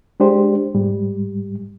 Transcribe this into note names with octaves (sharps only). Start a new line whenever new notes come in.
G#3 D4 G4 C5
G#2 G3